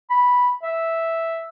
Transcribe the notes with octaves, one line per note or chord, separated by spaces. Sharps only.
B5
E5